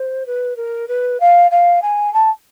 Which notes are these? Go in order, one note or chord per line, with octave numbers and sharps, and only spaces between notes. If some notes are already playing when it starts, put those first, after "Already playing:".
Already playing: C5
B4
A#4
B4
F5
F5
G#5
A5